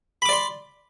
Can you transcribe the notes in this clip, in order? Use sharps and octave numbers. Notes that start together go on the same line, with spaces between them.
D5 B5 C6 D6